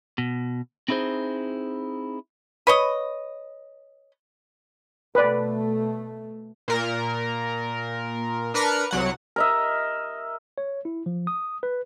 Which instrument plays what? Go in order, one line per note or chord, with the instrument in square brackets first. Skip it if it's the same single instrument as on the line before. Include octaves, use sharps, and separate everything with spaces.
[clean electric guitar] B2
C4 D#4 E4 G#4 C5
[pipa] B4 C#5 D#5
[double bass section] B2 A3 [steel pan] B4 D5
[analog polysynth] A#2 A#4
D4 A#4 B4 F6 C#7
C2 F#3 F#5
[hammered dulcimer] A#4 D#5 E5
[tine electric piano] C#5
E4
F3
D#6
B4